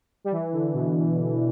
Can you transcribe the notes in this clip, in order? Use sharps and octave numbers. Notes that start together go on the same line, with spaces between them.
G3
E3
D3
B2